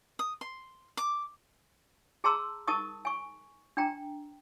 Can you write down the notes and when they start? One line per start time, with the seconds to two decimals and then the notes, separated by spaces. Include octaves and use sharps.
0.19 D#6
0.41 C6
0.97 D6
2.24 G#4 A5 A#5 C6 E6
2.67 D#4 A#4 A5 C#6 D#6
3.05 G#5 C#6
3.77 D4 G5 A#5